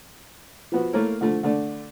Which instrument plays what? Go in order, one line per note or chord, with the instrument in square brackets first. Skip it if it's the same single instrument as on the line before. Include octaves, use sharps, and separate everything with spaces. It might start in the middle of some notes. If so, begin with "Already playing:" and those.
[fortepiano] F3 B3 F#4
A3 A#3 E4 A#4 C#5
D3 F3 A3
D3 A3 D4